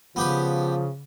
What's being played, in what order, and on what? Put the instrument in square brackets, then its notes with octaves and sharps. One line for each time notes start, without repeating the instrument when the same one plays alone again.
[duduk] C#3 [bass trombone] F3 [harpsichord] B3 G4 B4